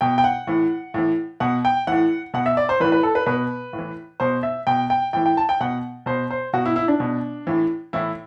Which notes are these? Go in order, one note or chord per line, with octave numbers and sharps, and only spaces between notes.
B2 G5
G5
F#5
A2 E3
A2 E3
B2 F#5
G5
A2 E3 F#5
B2 F#5
E5
D5
C5
A2 E3 B4
B4
A4
B4
B2 B4
A2
E3
B2 C5
E5
B2 G5
G5
A2 E3 G5
G5
A5
G5
B2 F#5
B2 C5
C5
B2 F#4
E4
E4
D4
B2
A2 E3
A2 E3 E4